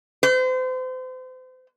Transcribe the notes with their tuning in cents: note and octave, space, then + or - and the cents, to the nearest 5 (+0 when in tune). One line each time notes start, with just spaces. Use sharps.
C5 -35